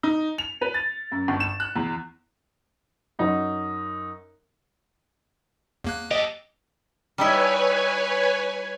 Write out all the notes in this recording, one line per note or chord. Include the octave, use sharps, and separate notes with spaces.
D#4
F7
B4
A6
F#2
G1
E7
F#6
E2
F#2 D#4 F#4
E2 A#3 F#6
G4 A4 D#5
G3 D#4 E4 B4 C#5 G#5